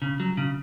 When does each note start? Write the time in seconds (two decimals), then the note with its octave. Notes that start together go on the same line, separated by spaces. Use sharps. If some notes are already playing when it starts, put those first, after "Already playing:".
0.02 C#3
0.20 F#3
0.37 C#3